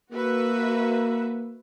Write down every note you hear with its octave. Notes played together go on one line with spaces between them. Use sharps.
A#3 F#4 B4 E5